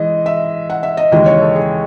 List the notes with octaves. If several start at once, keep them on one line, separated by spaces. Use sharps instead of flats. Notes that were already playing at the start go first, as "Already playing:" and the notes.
Already playing: E3 G#3 D#5
E5
F#5
E5
D#5
D#2 C#3 E3 G#3 D#5
C#5
A4
G#4